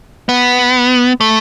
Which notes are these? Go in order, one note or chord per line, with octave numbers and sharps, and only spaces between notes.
B3
A3